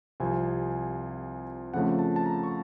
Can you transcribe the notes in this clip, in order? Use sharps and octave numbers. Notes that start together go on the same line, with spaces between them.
C2 C3 F3 G#5
F2 C#3 F3 A3 F#5
A5
A5
A#5
C#6